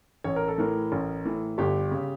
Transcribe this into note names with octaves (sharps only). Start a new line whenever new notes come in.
A1 C#5
A#4
A4
A2 E3 A#4
A1
A2 E3
G1 G4
C#3